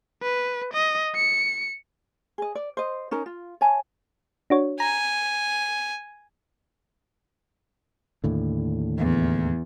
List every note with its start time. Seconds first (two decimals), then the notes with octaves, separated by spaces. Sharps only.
0.22 B4
0.74 D#5
1.15 C#7
2.38 G#4 D#5
2.55 D5
2.77 C5 D#5
3.11 C#4 D#4 A#4
3.26 F4
3.61 C#5 E5 G#5 A5
4.50 D4 F#4 C#5
4.80 G#5 A#5
8.24 D#2 A2 D3
8.98 E2